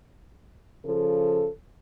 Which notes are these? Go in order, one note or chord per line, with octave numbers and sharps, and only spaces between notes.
C#3 F3 A4